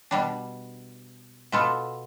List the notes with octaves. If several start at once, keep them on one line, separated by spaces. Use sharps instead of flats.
B2 G3 D4
B2 B3 F4 A4